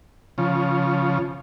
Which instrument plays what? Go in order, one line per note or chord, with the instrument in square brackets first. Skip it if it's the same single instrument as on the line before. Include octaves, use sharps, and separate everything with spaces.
[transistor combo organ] C#3 F3